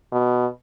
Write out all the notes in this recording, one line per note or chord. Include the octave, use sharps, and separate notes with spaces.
B2